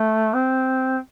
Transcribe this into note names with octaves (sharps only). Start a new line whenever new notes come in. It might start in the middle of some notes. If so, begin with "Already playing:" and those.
Already playing: A3
C4